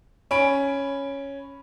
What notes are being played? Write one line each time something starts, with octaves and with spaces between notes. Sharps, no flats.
C#4 B5 D7